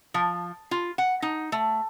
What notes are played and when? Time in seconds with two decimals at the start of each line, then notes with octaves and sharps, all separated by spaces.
0.14 F3
0.71 F4
0.98 F#5
1.22 D#4
1.52 A3